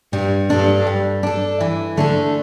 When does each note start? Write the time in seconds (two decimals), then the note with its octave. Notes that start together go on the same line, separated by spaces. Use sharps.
0.13 G2 G3
0.50 G2 D4 A4
0.87 G3
1.23 D4 A4
1.61 E3
1.97 D3 A3 D4 A4